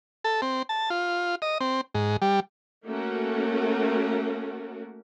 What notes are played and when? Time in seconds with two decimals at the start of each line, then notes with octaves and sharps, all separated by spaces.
0.24 A4
0.42 C4
0.69 A5
0.90 F4
1.42 D#5
1.61 C4
1.94 G#2
2.22 G3
2.86 A3 A#3 C#4 F#4 A#4